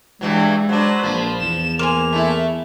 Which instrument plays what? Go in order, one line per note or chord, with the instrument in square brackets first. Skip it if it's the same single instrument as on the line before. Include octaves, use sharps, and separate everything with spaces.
[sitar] G2 E3 F#3 [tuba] G#3
[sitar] F#3 D4 [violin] B4 C5
[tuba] A#1 [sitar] F3
[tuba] E2 [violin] E7
[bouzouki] A#3 C5 G#5 [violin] F7
[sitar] A3 E4